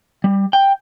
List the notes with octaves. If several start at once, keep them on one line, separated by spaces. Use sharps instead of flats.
G3
G5